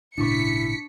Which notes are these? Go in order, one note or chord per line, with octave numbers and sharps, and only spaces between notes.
G#1 A#2 C#3 D4 E4 C#6 B6 C#7